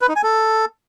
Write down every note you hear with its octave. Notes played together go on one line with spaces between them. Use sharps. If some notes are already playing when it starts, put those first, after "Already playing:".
B4
D#4
G#5
A4